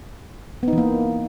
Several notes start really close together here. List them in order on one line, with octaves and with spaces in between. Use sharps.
B3 D#4 E3 A#3